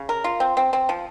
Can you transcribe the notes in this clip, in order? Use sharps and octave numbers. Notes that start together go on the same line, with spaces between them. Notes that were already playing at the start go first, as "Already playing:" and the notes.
Already playing: C#3
A#4
F4
C4
C4
C4
F3